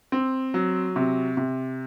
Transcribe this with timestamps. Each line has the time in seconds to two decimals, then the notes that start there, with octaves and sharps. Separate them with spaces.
0.12 C4
0.54 F#3
0.96 C3
1.37 C3